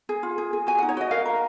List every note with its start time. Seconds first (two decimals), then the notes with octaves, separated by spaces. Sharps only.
0.09 G#4
0.23 F4
0.38 G#4
0.53 G#4
0.67 F#4 G#5
0.78 F#5
0.83 D#4
0.89 C#5
0.97 F#4 D#5
1.11 A#4 F5
1.26 A#4